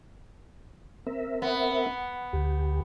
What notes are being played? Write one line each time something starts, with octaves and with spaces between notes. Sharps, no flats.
C4 A#4 E5
B3
D2 G4